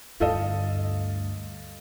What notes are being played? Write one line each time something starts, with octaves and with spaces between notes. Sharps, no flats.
D2 G2 F4 A4 D#5